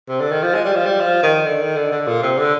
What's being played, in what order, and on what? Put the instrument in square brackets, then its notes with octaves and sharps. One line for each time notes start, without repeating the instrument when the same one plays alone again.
[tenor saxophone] C3
D3
D#3
F3
G#3
G3
F3
G3
F3
D#3
D3
D#3
D3
D3
A#2
C3
D3